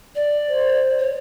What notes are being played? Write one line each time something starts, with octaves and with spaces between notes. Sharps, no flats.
D5
C5
C#5